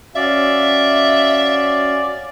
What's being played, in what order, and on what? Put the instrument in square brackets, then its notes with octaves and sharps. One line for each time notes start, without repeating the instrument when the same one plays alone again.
[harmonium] C#4 F#4 F5 [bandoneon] D5 [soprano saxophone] E5